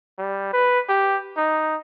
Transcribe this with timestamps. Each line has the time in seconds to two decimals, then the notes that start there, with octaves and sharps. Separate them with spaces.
0.18 G3
0.53 B4
0.89 G4
1.37 D#4